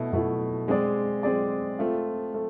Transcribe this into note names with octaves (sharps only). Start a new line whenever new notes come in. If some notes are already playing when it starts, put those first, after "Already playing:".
Already playing: B2 A3 E4
B2 A3 E4
G#3 C4 G#4 D5
G#3 C4 G#4 D5
A3 C4 F4
A3